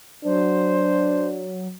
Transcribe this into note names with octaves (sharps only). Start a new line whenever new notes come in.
F#3 D4 C5